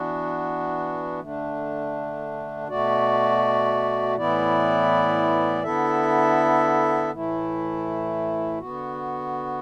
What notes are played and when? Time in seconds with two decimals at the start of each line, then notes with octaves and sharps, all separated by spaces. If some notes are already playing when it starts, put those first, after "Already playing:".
Already playing: E3 B3 D4 F#4
1.20 D3 A3 D4
2.68 B2 A3 F#4 D5
4.15 A2 E3 B3 E4 D5
5.63 D3 B3 E4 A4 E5
7.11 A2 E3 A3 E4
8.59 D3 B3 F#4